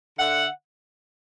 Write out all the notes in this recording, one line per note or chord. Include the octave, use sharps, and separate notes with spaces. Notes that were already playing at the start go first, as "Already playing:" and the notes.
D3 E5 F#5